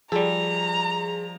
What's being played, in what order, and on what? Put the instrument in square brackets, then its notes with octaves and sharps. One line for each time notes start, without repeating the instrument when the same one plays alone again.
[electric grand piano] F3 [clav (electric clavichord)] G3 A4 [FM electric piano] G#4 [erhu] A#5